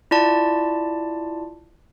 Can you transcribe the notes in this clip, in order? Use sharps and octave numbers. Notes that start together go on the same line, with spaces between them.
E4 F4 D5 A5